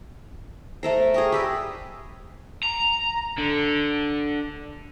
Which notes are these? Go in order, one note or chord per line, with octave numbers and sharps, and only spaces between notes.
A3 A4 A#4 C5
G#4 A#4 G5 C#6 D#6
G4 B4 D5 D6 E6
A#5
D3